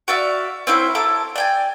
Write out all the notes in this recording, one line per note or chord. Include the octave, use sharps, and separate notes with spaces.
F#4 D5 E5 F5
C4 C#4 E4 C5
E4 A4 A#5 D6
D5 G5 G#5